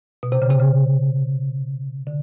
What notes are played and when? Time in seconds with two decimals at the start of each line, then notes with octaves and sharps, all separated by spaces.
0.23 B2
0.32 C3
0.42 C#3
0.51 C3
0.60 C#3
2.07 D3